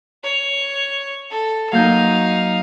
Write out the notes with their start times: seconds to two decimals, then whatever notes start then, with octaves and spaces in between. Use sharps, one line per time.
0.24 C#5
1.30 A4
1.72 F#3 A#3 D#4 F5 G6